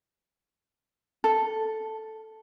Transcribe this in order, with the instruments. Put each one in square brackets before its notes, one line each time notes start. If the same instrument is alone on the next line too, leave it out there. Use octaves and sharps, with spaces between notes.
[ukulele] A4